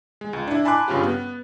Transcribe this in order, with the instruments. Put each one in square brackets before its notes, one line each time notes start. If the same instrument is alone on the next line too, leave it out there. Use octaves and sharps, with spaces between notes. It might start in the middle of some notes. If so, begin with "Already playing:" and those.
[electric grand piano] G#3
C#2
D4 E4
G#5 A5 B5 C6 D6 F#6
G2 C#3 C#4 F4 G4
B3